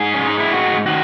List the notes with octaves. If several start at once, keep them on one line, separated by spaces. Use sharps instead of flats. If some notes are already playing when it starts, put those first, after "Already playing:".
Already playing: G#2 G#4
C#4
G#3
D#4
E4
G#2 F#4
D#3 F#4